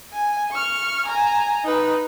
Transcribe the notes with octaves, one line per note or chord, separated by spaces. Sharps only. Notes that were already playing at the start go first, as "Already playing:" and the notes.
G#5
C#6 F6
G#5 A#5
D#4 B4